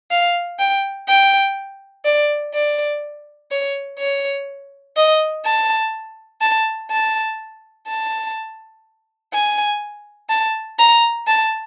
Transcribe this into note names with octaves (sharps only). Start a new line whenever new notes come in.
F5
G5
G5
D5
D5
C#5
C#5
D#5
A5
A5
A5
A5
G#5
A5
A#5
A5